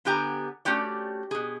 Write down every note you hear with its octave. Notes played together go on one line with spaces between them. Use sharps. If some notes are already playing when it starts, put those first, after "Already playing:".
D3 B3 G4 G#5 A#5
A3 C#4 F#4 G4 D5
B2 G#4